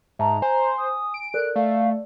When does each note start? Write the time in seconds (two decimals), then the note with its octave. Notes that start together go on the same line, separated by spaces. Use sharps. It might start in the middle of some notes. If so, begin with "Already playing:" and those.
0.19 G#2 E5 A5 A#5
0.42 C5 G#5
0.78 D#6
1.14 D7
1.34 A4 A#4 D5 F#6
1.56 A3 D5 F5